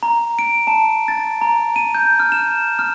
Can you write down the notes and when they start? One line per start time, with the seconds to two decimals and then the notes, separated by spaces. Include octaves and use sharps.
0.03 A#5
0.39 D7
0.67 A5
1.08 A6
1.41 A#5
1.76 D#7
1.95 G6
2.20 F6
2.32 E7
2.79 F6